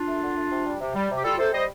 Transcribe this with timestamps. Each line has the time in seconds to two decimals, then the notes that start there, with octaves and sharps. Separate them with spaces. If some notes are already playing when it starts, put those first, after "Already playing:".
Already playing: D4 F4
0.08 A3
0.23 D3
0.37 A3
0.51 C3
0.66 G3
0.81 C3
0.95 G3
1.10 C3
1.16 G4
1.24 G3 F4 A4
1.39 C3 A4 C5
1.53 G3 C5 D#5